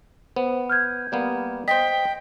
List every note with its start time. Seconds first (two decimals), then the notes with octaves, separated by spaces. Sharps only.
0.36 B3 C5
0.70 F6 G6 G#6
1.12 G3 A#3 B3
1.68 C5 D#5 G5 B6